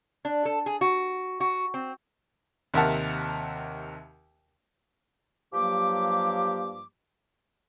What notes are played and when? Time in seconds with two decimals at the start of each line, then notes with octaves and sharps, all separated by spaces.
0.25 D4
0.45 A4
0.66 G#4
0.81 F#4
1.40 F#4
1.74 C4
2.74 D#2 C3 A#4 E5 F#5 A5
5.53 G2 F3 F#3 A#3 G4 D6